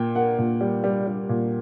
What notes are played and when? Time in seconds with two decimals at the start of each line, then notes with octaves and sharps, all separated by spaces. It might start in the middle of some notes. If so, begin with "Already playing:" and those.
Already playing: A#2 A#3 G5
0.15 A#3 F#5
0.38 A#2
0.61 G3
0.84 G3
1.07 G3
1.29 A#2